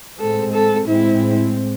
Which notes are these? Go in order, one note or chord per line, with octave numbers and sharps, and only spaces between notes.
A2 G#3 C4 A4
A4
A2 G#3 C4 E4